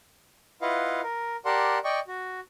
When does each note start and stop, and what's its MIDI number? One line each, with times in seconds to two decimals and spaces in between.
0.62 1.01 64
0.62 1.01 65
0.62 1.01 71
0.62 1.01 75
0.62 1.01 77
0.62 1.01 78
1.03 1.36 70
1.45 1.78 67
1.45 1.78 70
1.45 1.78 74
1.45 1.78 78
1.45 1.78 81
1.45 1.78 84
1.84 2.00 74
1.84 2.00 75
1.84 2.00 79
1.84 2.00 85
2.08 2.40 66